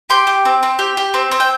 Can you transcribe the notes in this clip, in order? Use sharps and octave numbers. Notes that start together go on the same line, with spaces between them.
G4 G5 C6
G4
C4
C4
G4
G4
C4
C4
G5